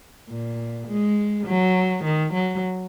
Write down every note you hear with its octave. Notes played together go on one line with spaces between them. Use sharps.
A#2
G#3
F#3
D#3
F#3